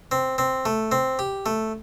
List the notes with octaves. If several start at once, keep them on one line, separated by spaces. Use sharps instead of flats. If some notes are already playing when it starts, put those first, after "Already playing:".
C4
C4
A3
C4
G4
A3